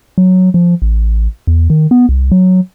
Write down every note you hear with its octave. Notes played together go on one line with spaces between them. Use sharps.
F#3
F3
A1
E2
D#3
B3
C2
F#3